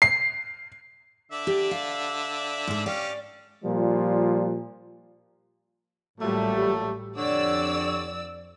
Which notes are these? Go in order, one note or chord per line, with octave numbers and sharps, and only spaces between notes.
C7
D3 D5 E5
G4
F5
G#2 C5
C#4 G4 D5 F5
A#2 F3 G3
A1 A#2 F#3 G3 A3
F2 D3 G4 C#5 D5 E6